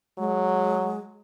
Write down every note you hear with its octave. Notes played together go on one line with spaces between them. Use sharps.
F#3 G#3